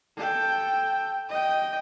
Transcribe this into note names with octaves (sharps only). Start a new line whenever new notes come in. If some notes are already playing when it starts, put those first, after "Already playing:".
A4 G5
D#5 G5